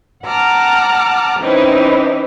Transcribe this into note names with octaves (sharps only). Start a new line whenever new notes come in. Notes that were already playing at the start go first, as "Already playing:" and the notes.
F#5 A5 A#5 D6 F6
E3 C4 C#4 D#4 E4